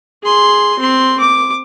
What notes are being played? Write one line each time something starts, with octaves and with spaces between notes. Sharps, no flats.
G#4 C6
C4 C6
D6